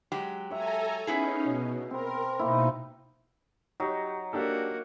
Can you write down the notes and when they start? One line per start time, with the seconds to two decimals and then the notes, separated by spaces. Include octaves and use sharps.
0.12 F#3 G#3 G4
0.50 A4 C#5 E5 G#5 A#5
1.07 B3 C#4 D#4 E4 G#4
1.44 B2
1.91 C4 A#4 B4
2.39 B2 A#3 D#4 E4
3.80 F#3 D#4 G4
4.33 A#3 D4 F#4 G4 A4